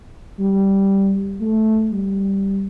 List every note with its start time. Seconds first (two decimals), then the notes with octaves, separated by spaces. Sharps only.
0.39 G3
1.41 A3
1.91 G3